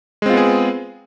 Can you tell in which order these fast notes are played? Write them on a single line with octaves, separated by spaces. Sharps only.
G#3 C4 F4 B3 G#4